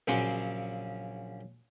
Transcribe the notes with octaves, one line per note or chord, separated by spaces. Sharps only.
A#1 C#3 F#3 C#4 C6 D6